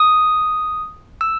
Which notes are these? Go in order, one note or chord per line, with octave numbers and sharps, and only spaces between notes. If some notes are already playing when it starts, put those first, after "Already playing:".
Already playing: D#6
E6